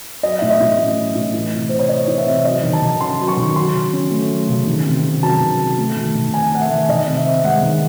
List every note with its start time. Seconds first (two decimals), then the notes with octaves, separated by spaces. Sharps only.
0.23 F#3 D#5
0.38 A2 E5
0.51 D#5
0.60 A2
0.78 C#4
0.97 F#3
1.15 A2
1.34 E3
1.52 C3
1.69 C3 C5
1.79 C#5
1.89 C4 D#5
2.07 E3
2.18 E5
2.26 C3
2.45 F#3 D#5
2.63 D#3
2.73 A5
2.82 D#3
3.01 C#4 C6
3.20 F#3
3.28 C#6
3.37 D#3
3.56 F#3 C6
3.74 C#3
3.93 C#4
4.11 A3
4.30 F#3
4.49 C#3
4.67 D#3
4.85 C3
5.04 C3
5.22 F#3 A5
5.40 D#3
5.59 C3
5.78 A3
5.96 D#3
6.15 D#3
6.34 C4 G#5
6.52 A3 F#5
6.61 E5
6.71 D#3
6.89 D#3 D#5
7.07 C3
7.17 E5
7.25 C4
7.44 G#3 F#5
7.62 D#3